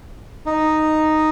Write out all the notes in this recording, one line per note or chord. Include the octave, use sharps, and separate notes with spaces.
D#4